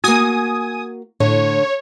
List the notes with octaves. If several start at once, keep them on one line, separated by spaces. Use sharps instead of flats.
A#3 F#4 G#5 D#6
A2 D3 C#5